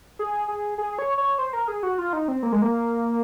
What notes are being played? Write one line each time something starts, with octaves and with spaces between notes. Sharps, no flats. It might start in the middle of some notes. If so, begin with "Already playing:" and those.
G#4
G#4
G#4
C#5
C#5
C5
A#4
G#4
F#4
F4
D#4
C4
A#3
G#3
A#3